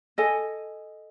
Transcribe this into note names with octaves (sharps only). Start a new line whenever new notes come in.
A4 D#5 G#5